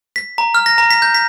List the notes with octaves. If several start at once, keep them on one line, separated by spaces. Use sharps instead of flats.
B6
A#5
F6
A#6
A#5
B6
G6
B6